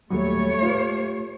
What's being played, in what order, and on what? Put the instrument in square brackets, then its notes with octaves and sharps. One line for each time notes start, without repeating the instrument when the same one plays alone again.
[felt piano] D#1 F#3 G3 [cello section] A3 C#5
[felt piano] F4 G4 B4